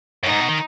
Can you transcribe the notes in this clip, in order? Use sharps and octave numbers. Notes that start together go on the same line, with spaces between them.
F#2 D#4
G#2
B2
D#3